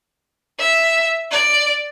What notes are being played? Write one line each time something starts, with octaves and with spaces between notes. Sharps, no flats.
E5
D5